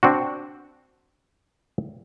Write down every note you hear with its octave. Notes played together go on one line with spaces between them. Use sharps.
C4 D4 F#4